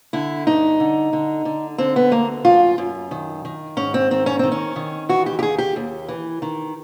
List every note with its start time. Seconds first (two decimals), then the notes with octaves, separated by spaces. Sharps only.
0.13 D3 E4
0.47 G2 D#4
0.80 D3
1.13 D3
1.45 D3
1.78 D3 C4
1.96 B3
2.11 D2 A#3
2.45 F#2 F4
2.78 F#2
3.11 D#3
3.45 D#3
3.77 G#2 C#4
3.94 C4
4.11 D#3 C4
4.26 C#4
4.39 D#3 C4
4.52 C#4
4.76 D#3
5.09 E3 F#4
5.26 G4
5.39 G4
5.42 D#2 G#4
5.58 G4
5.76 D#2
6.08 E3
6.42 D#3